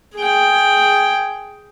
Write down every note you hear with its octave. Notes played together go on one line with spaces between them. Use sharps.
G#4 G5